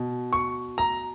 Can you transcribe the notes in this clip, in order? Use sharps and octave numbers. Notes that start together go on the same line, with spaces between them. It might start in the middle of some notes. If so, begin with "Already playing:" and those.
Already playing: B2
C#6
A#5